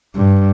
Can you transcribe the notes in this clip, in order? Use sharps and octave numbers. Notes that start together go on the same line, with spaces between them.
G2